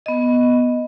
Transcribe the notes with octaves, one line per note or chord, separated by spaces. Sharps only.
B3 D#5